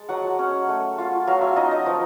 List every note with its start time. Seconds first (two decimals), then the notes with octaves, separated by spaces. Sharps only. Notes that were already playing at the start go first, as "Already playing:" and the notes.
Already playing: G#3 A5
0.09 F#3 F#5
0.39 C#4
0.69 A3
0.98 F4
1.27 F#3 F5
1.41 E5
1.56 D#4 D#5
1.71 D#5
1.86 F3